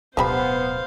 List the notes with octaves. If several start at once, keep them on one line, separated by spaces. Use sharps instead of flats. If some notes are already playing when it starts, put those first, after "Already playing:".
D1 B2 F3 G3 B3 C5 F5 B5